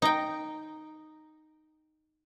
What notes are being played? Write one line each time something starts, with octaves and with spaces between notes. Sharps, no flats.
D#4 G5